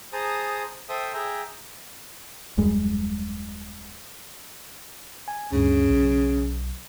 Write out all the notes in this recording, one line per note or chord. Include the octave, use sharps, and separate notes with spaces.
G#4 C5 A5 A#5 D#6
A4 C5 E5 G5 D#6
G#4 E5 G5 A#5
D#1 F#2 G3 G#3
G#5
D2 G2 C#3
B1